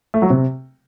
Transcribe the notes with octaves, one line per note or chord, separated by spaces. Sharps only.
A3
F#3
C3